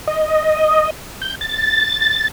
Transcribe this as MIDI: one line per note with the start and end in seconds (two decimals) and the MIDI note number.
0.07 0.90 75
1.22 1.35 91
1.41 2.28 93